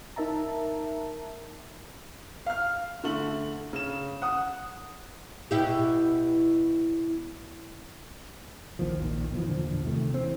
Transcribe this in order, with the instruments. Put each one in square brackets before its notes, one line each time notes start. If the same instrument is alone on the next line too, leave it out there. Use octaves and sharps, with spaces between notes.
[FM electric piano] D#4 A#4 E5 A5 A#5
[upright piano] F5 F6
D3 A3 F#7
C#3 E7
F#5 D#6
[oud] B2 E4 G4
[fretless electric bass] A#1 D#2 D#3 F3
A#1 A#2 D#3
B2 E3 F3
E2 A#2 D3 F3
C3 D#3 A3
E3 C4